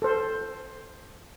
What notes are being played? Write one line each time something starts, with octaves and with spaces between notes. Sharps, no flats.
A4 C5